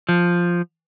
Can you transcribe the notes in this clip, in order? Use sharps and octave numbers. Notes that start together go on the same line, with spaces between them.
F3